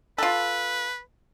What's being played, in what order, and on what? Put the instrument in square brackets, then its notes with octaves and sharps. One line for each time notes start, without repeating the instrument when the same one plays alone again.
[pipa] F4 A4 [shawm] B4